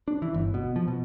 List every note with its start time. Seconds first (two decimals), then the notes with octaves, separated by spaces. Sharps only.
0.08 D4
0.22 E3
0.34 G1
0.54 B2
0.76 F3
0.88 B2